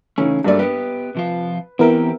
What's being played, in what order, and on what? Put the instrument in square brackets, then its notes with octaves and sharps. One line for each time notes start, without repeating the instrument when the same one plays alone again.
[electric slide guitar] C#3 E3 A3 [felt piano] C#4 D#4
[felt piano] G2 A#3 D5 [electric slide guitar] F#3 A3
[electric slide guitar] B3 G4 [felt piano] B4
[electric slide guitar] C3 F3 F4
[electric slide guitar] E3 C4 G4 [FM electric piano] B3 E4 A#4